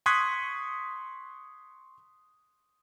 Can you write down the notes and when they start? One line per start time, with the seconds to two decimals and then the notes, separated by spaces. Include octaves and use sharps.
0.06 C6 C#6 D#6 F#6 G#6 B6